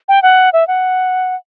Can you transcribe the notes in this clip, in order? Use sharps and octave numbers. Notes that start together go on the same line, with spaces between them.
G5
F#5
E5
F#5